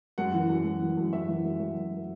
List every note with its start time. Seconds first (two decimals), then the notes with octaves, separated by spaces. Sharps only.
0.18 F#2 F#5
0.34 E3
0.50 F#2
0.65 F#2
0.82 E3
0.97 F#2
1.13 F#2 E5
1.29 E3
1.45 F#2
1.60 F#2
1.76 F#2